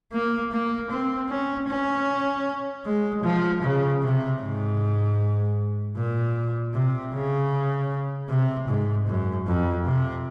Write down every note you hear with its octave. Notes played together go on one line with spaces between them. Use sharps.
A#3
A#3
C4
C#4
C#4
G#3
F3
C#3
C3
G#2
A#2
C3
C#3
C3
G#2
F#2
F2
C3